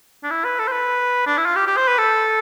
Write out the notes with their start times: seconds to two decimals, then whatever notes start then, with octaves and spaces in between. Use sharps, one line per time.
0.23 D4
0.31 E4
0.44 B4
0.59 A4
0.67 C5
0.72 B4
1.26 D4
1.37 E4
1.46 F4
1.56 G4
1.66 G4
1.77 C5
1.88 B4
1.98 A4